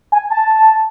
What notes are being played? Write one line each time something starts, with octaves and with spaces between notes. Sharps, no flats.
G#5
A5